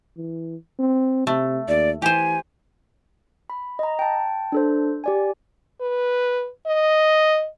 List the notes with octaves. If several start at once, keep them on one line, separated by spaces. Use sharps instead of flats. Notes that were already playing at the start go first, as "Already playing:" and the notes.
E3
C4
C3 A3
D#2 D5
E3 G4 C5 G#5
B5
D#5 A#5
G5 A5
D4 A4 C5
G4 D5 G#5
B4
D#5